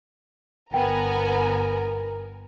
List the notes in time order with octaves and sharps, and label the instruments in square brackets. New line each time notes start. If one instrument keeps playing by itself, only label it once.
[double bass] G1 [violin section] B3 G#5 A#5 [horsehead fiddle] A#4 [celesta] G5